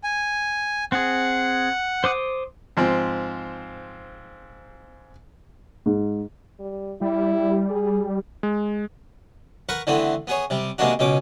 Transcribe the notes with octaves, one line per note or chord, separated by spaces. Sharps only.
G#5
C4 G#4 F#5
C5 D6 D#6
G#2 F3 C4
G#2
G3
G3 E4
G#4
G#3
A#4 B4 F#5 B5 C#6
D3 E3 A3 B3 C4
B3 G#4 C#5
C3 G3
C3 G#3 A#3 B3 D4 F#4
C#2 B2 C#4 D6